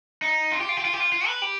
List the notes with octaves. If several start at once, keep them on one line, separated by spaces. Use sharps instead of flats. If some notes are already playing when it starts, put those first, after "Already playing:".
D#4
F4
G4
F4
G4
F4
G4
F4
F4
B4
G4